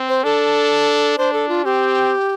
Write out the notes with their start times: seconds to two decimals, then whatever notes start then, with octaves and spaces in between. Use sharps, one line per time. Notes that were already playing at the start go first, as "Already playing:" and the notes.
Already playing: C4
0.09 C5
0.24 D4 A4
1.18 D4 C5
1.33 A4
1.49 F4
1.65 C4 G4